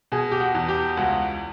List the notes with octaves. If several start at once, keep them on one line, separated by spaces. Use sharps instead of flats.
B2 G#4
G4
F#4
E2
G4
C#2 F#4